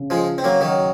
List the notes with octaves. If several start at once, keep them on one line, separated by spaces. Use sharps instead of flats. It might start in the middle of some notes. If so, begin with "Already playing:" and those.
Already playing: C#3
F3 G#3
C4
F#3 A#3
D#3 F#3